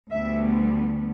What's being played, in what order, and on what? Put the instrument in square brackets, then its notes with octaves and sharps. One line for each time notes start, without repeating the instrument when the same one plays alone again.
[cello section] D2 D3 G3 B3 E5